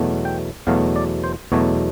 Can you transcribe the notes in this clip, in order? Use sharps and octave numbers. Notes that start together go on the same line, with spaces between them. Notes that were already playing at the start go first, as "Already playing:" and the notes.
Already playing: E2 B2 F#3 A3
G5
E2 B2 F#3 A3 F5
D5
C5
E2 B2 F#3 A3 C#5